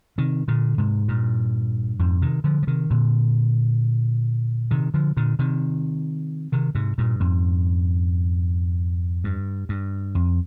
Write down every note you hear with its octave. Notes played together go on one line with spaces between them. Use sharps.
C3 D#3
A#2 D3
G#2 C3
G2 A#2
F2 G#2
C3 D#3
D3 F3
F3
C3 D#3
A#2 D3
C3 D#3
D3 F3
A#2 D3
C3 D#3
C3 D#3
G#2 C3
G2 A#2
F2 G#2
G2
G2
F2